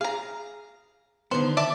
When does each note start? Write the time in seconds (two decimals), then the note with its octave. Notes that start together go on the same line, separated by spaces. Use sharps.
0.01 G#4 F5 A#5
1.31 D3 D#3 B3 C5
1.57 D5 E5 A5